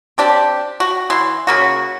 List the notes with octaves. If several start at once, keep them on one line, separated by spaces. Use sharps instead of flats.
C4 D4 G4
F#4
E3 C6
C#3 A#3 F#4